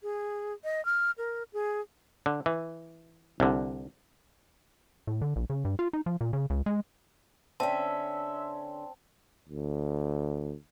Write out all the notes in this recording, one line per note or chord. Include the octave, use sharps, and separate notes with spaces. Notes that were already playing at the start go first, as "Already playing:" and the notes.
G#4
D#5
F6
A#4
G#4
D3
E3
C2 D3
A2
D3
A#1
C#3
G2
F4
D#4
F3
A#2
C#3
C#2
G#3
D3 C4 C#4 E5 A5
D2